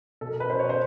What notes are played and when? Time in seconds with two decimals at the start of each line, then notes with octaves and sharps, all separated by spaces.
0.21 B2 A4
0.31 A#4
0.40 B4
0.50 B2 C5
0.59 C#5
0.69 C5